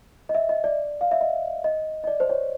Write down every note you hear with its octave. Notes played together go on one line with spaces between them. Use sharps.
D#5
E5
D#5
D5
F5
E5
D#5
D#5
D#5
D5
C5
C#5